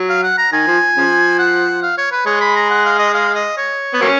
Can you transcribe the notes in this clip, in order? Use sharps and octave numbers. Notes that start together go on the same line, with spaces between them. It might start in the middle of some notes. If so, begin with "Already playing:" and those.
Already playing: F#3
F5
F#5
A#5
D#3 G#5
F3
C#3 F3
F#5
F5
C#5
B4
G#3 C#5
B5
A#5
F#5
F5
D#5
F5
D#5
C#5
B3
F#3 A#3 C#4